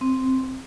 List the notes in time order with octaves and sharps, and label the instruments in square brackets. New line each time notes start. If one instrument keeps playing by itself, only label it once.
[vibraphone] C4